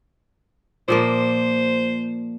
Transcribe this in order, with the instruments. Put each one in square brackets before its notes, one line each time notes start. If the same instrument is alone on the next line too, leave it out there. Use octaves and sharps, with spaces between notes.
[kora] A#2 F3 A#3 [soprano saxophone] C5